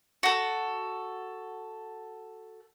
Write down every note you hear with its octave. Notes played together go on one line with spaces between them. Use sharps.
F#4 A4